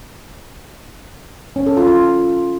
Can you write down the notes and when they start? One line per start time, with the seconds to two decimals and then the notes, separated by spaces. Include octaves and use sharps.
1.56 C#4
1.66 A4
1.77 F4
1.87 F4